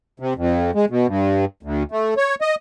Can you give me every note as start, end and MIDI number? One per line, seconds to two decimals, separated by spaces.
0.20 0.34 48
0.37 0.71 41
0.75 0.85 56
0.90 1.07 47
1.07 1.45 43
1.63 1.83 38
1.92 2.14 57
2.17 2.35 73
2.41 2.55 75